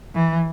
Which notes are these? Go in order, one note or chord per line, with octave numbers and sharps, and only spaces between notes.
E3